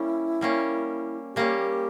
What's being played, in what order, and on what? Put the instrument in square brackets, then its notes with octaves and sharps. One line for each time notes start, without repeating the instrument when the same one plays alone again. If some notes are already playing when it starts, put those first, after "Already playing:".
Already playing: [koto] G3 A#3 C#4 [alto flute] E4
[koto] G3 A#3 C#4
[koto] G3 A#3 C#4 [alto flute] G4